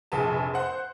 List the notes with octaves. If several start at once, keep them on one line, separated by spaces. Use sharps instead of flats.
F1 A#1 G#4 B4 A5
C5 F#5 C6